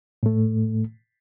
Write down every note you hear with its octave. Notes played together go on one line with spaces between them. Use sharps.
A2 A3